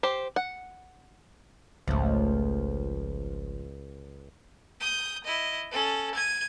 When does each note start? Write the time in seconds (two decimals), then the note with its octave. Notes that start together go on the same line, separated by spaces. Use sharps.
0.03 G4 C5
0.36 F#5
1.88 G#1 C#2 F3 A3
4.81 D#6 G6
5.24 E4 D#5
5.71 C#4 A4
6.15 G#6 D#7